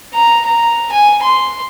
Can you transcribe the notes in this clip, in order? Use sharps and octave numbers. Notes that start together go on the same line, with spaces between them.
A#5
A#5
G#5
C6